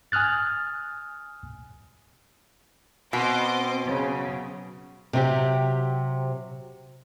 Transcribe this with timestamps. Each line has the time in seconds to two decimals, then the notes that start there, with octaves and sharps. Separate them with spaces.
0.12 G#5 D#6 F6 F#6 A6
3.13 B2 C4 D#5 C6 D6
3.84 C#3 F#3
5.13 C3 F#3 C4 G4